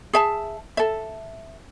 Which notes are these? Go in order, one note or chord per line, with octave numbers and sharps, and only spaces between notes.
G#4 E5 A5
A4 E5